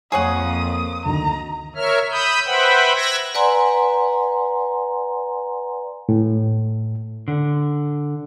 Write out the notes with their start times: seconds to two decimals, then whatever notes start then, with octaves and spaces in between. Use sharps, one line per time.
0.12 F2 A#3 G#4 C#5 F#5 G5 D#6
1.06 D2 D#3 A#5
1.76 A#4 C#5 E5 F6
2.11 B5 D#6 E6 G6
2.46 B4 C5 E5 F#5 G5 B5
2.96 E6 F#6 G#6 A#6
3.35 B4 D5 F#5 G#5 A#5 C6
6.09 A2
7.28 D3